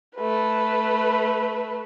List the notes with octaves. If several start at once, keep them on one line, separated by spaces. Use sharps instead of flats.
A3 B4